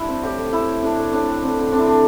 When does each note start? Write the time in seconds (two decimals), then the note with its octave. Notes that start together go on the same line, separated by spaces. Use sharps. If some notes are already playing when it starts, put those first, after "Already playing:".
Already playing: G3 D4 E4
0.08 C4
0.23 A2 G4
0.37 A3
0.52 A3 E4
0.68 A2
0.83 A2 D4
0.98 A3
1.12 A2 D4
1.27 A2
1.42 D3 C4
1.58 D3
1.72 C4 D4
1.79 E4
1.86 D3 D4